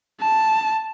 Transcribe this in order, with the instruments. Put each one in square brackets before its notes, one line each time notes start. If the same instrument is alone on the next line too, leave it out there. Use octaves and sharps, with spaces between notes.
[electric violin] A5